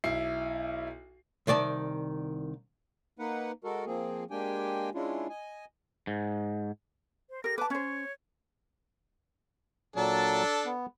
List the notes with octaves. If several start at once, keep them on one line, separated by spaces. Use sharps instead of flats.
B1 E4 C7
C2 D#3 D5 A5
A#3 D#4 B4 F#5
G#3 F#4 A4 A#4
F3 A#3 C4 G#4
G#3 A#3 D4 G4 G5 G#5
G#3 C#4 D4 E4 F4
D#5 G#5
G#2
C5
G4 A#4 A#6
B4 A5 D6
C#4 C5 C#5
A#2 F#3 D4 A4
B3